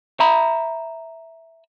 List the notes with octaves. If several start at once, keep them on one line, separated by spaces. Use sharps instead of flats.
E5 A#5 B5